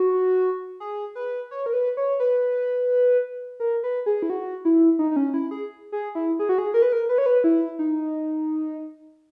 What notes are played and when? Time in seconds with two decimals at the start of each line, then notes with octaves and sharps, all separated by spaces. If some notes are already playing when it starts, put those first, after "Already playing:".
Already playing: F#4
0.80 G#4
1.15 B4
1.51 C#5
1.66 A#4
1.73 B4
1.97 C#5
2.20 B4
3.60 A#4
3.83 B4
4.06 G#4
4.22 E4
4.30 F#4
4.65 E4
4.99 D#4
5.11 D#4
5.16 C#4
5.34 E4
5.51 G#4
5.92 G#4
6.15 E4
6.39 G#4
6.49 F#4
6.58 G#4
6.74 A#4
6.82 B4
6.92 A#4
7.09 B4
7.18 C#5
7.26 B4
7.44 E4
7.79 D#4